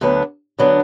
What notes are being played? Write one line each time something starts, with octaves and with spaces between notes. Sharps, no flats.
D2 D3 F#3 B3 D4
D2 D3 F#3 B3 D4